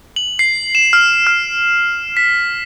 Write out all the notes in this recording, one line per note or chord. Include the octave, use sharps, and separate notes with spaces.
F#7
C7
E7
F6
F6
B6